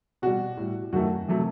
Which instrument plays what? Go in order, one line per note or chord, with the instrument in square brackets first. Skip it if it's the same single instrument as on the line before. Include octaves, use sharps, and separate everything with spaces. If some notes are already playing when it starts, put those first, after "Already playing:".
[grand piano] B2 G3 F#4
A2 G3
F#2 D#3 A3 F#4
C3 F#3 A3